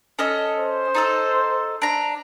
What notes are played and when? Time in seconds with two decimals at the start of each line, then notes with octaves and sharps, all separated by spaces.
0.19 C#4 A4 D#5
0.57 C5
0.95 D#4 A4 E6
1.82 D4 A#5